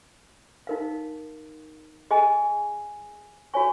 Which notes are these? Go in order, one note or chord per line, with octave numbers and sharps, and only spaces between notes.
D#4 A#4 F5
G#4 D#5 G#5
F#4 C#5 G#5 C#6